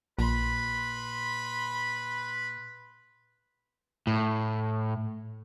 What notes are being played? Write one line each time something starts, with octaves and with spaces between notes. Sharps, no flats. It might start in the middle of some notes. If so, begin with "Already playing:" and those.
A#1 A#2 B4 B5 C6
A2